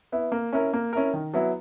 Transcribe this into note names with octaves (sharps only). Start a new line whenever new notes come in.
B3 E4
A#3
C#4 E4 A#4
A#3
C#4 E4 A#4
D#3
F#3 B3 E4